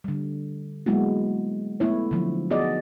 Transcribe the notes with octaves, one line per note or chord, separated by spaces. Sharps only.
D3 G3
F#3 G#3 A#3 B3 E4 F#4
A3 B3 E4 C#5
D3 F3 F#3
B3 F#4 G#4 D5 D#5